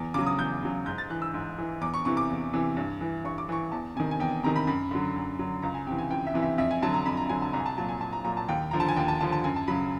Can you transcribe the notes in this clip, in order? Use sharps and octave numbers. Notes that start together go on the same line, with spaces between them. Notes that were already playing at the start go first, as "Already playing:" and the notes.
Already playing: E2
C#3 F#3 D6
D#6
E2 G6
C#3 F#3
G#2 G6
A6
E3 F#6
E6
G#2
E3
E2 D6
C#6
C3 E3 C#6
D6
E2
C3 E3
G2
E3
G2 C#6
D6
E3 C#6
E2 A5
C3 D#3 G#5
G#5
E2 G5
C3 D#3 A#5
B5
F#2 B5
D3 F#3
F#2
D3 F#3
C#2 A#5
G#5
C3 E3 G5
G#5
C#2 G5
E5
C3 E3
E5
F2 E5
G#5
D3 F#3 A5
A#5
F2 B5
A#5
D3 F#3 G#5
A5
C2 A#5
G#5
A5
A#2 F#3 A5
G#5
C2 A5
A#5
A#2 F#3 A#5
A5
D#2 G5
D3 F3 A#5
A5
G#5
D#2 G5
A5
D3 F3 A5
A5
F#2 G#5
A5
C#3 F#3 B5